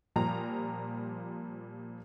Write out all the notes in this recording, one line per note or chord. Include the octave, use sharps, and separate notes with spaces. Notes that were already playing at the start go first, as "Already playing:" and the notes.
A#2 F3 G3 A#5